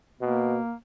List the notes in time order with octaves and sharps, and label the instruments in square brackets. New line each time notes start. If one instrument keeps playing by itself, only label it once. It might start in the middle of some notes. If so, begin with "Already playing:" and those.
[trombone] B2 [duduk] A#3